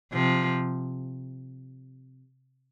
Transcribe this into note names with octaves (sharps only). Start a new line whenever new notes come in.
C3 F3